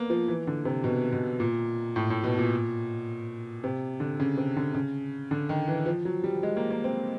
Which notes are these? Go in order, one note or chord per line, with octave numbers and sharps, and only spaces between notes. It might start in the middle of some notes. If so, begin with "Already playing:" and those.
Already playing: A#3 B3
F3
E3
D3
C3
B2
B2
A#2
A2
A2
B2
A#2
C3
D3
C#3
C3
D3
C#3
D3
D#3
E3
F3
F#3
G3
G#3
A#3
A#3
C4